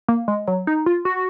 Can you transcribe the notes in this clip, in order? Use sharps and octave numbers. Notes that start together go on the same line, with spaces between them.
A#3
G#3
F#3
D#4
F4
F#4